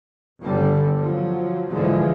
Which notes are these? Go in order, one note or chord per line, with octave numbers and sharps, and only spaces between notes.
G1 D3 G3
F3 F#3
B1 G#2 D3 E3 F3 G#3